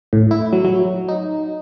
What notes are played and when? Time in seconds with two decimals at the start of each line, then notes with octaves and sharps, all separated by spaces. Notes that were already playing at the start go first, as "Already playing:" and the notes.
0.13 A2
0.31 E4
0.53 F#3
0.64 F#3
1.08 D#4